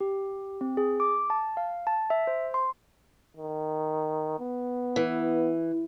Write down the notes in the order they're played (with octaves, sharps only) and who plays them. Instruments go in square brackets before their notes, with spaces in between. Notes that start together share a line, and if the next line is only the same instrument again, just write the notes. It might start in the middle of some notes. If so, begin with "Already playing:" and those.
[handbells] G4
C4
G#4
D6
A5
F5
A5
E5
C5
C6
[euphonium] D#3
B3
[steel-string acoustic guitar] E3